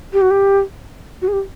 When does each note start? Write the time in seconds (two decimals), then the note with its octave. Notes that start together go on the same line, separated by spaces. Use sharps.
0.13 G4
0.21 F#4
0.30 G4
1.22 F#4
1.28 G#4
1.33 G4